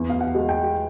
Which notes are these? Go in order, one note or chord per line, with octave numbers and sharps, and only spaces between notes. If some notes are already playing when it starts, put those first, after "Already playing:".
Already playing: E2
F5
F#5
G#3
G5